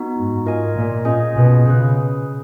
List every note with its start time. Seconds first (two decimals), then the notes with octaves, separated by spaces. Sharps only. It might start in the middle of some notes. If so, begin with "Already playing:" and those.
Already playing: B3 D#4 F#4
0.16 G#2
0.45 F4 A#4 D#5 G#5
0.76 A#2
1.05 C#4 F4 G#4 D#5 G#5
1.35 B2
1.66 C#3 C#4 G#4 B4